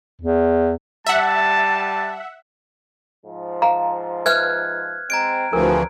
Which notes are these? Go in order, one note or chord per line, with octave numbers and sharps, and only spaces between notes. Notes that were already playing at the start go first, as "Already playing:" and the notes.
E2
G3 E5 F#5 A5
G#2 F3
F5 A#5
B4 E5 F6 F#6 G#6
G#3 C4 A#5 G#6 D7
D2 E3 F3 C4 F#4 G#4 A#4